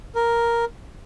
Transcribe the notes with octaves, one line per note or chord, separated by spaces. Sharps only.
A#4